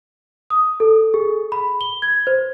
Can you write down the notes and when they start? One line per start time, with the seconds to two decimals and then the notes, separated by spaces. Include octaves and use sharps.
0.50 D#6
0.80 A4
1.14 G#4
1.52 B5
1.81 G7
2.02 G#6
2.27 C5